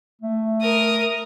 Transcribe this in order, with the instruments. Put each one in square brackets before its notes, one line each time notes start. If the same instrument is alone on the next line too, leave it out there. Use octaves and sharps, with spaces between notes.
[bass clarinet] A3
[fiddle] A#4 D#6